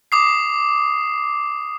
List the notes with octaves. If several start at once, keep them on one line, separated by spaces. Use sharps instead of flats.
D6 D#6 C7